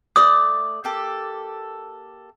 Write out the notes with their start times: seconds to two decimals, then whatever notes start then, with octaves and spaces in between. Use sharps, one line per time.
0.16 A3 D5 D#6 F#6
0.84 A#3 G4 A4